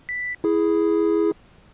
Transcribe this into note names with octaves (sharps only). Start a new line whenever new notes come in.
B6
E4 G#4